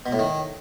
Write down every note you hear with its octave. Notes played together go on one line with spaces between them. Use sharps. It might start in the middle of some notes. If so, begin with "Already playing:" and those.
B2
A2
D#3